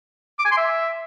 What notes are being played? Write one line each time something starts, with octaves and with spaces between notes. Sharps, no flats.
D6
G#5
C6
E5